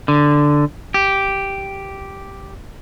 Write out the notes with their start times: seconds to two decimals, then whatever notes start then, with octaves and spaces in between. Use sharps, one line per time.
0.08 D3
0.94 G4